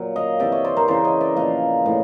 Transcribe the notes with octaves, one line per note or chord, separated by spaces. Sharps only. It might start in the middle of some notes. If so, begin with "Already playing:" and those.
Already playing: A#2 F#3
D#5 F5
C3 E3 D5 E5
C#5 D#5
C5 D5
A#4 C5
C#3 E3 C5 D5
C#5 D#5
D5 E5
A#2 F3 D#5 F5
A2 E3